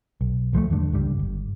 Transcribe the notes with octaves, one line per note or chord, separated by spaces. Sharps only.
B1
D1 F3 G#3 A3
E2 G2 D3
C#2 G2 G3
G1